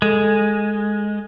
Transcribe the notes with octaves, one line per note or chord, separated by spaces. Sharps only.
G#3 A4